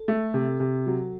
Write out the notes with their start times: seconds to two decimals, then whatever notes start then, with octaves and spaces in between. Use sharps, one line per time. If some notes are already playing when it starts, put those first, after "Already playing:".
Already playing: A4
0.08 A3
0.34 C3
0.60 C3
0.86 F#3